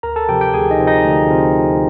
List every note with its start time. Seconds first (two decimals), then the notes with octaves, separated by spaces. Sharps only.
0.03 D2 A#4 A#5
0.16 A4 A5
0.29 C3 F3 G4 G5
0.41 G4 G5
0.54 D2 G#4 G#5
0.70 D#4 D#5
0.79 C3 F3
0.87 D#4 D#5
1.04 D2
1.29 C3 F3
1.54 D2